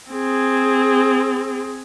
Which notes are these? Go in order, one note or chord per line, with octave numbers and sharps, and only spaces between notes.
C4 G#4